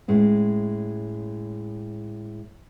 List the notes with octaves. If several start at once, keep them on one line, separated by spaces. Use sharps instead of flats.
A2 G#3 C#4